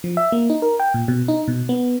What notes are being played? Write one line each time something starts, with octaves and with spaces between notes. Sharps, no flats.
F3
E5
A#3
D#4
A#4
G5
A#2
B2
D#4
B2
B3